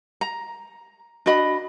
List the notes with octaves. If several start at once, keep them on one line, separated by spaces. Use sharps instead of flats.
A#5
D4 F#4 D#5 B5